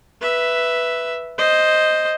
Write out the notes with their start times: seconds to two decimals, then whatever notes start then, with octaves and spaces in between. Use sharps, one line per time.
0.21 B4 E5
1.38 C5 D#5